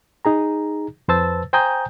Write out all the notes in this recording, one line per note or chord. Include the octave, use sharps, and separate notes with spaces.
D#4 G#4 A#5
F2 B4 C5 A5 E6 A6
C5 G5 G#5 A#5 D#6 G6